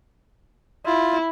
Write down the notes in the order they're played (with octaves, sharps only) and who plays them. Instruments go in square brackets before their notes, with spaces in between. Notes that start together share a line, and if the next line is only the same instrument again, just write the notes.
[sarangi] E4 [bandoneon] F4